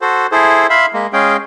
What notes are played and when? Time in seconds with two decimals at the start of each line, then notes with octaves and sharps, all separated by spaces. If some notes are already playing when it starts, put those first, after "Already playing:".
0.01 F#4 A4 C5
0.32 E4 G#4 A4 C5
0.70 E5 F5 B5 C6
0.94 G#3 A#3
1.13 G#3 C#4 G#4 F5 G5